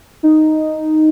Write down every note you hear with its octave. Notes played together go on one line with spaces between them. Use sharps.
D#4